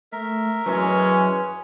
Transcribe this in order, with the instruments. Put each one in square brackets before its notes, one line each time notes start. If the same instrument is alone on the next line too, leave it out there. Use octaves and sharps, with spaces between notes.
[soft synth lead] A3 [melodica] A#4 E5
[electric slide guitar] F#2 E3 F#3 [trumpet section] G#3 C#4 [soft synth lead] B4